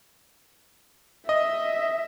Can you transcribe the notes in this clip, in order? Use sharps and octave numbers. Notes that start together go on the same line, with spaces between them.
D#5 E5